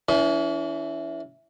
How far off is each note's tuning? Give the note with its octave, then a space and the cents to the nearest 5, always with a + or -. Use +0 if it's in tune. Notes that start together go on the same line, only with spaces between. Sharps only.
E3 +0 C#4 +45